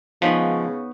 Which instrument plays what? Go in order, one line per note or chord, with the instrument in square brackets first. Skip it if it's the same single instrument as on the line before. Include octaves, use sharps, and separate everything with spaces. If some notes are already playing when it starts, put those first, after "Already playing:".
[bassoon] C#3 [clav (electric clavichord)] F3 [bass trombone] G#3 [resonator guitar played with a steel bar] B3 D#4 C#5